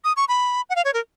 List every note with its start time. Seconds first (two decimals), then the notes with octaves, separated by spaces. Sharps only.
0.04 D#6
0.17 C#6
0.28 B5
0.70 F#5
0.76 F5
0.85 C#5
0.94 A#4